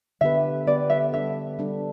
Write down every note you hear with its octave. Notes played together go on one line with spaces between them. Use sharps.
D3 B3 G4 B4 E5
D3 B3 G4 B4 D5
E5
G3 D4 A4 E5
G3 D4 A4